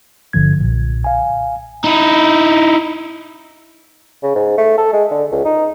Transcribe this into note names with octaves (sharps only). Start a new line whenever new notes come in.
G1 G2 D3 F3 G#6
B1 A#2
F5 G#5
D#4 E4
C#3
G#2
A3
A4
G#3
D3
C#2
D#4